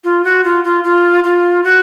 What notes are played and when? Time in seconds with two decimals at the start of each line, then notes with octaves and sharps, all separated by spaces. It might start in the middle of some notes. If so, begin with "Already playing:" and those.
0.04 F4
0.24 F#4
0.44 F4
0.64 F4
0.84 F4
1.24 F4
1.64 F#4